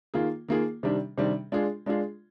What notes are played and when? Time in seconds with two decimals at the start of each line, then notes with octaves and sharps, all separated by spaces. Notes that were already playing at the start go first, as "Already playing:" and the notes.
0.14 D#3 A#3 F4 G#4
0.48 D#3 A#3 F4 G#4
0.83 C3 D#3 G3 D4
1.18 C3 D#3 G3 D4
1.52 G#3 D4 F4 G#4
1.86 G#3 D4 F4 G#4